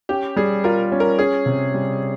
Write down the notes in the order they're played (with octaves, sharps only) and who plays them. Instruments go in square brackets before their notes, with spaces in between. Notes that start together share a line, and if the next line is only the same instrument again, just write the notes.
[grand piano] C#4 [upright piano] G4
[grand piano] G3 [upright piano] G#4
[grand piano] F4 [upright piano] A#4
[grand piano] C#4
[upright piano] A#4
[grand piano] C#4 [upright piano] G#4
[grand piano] C3
G3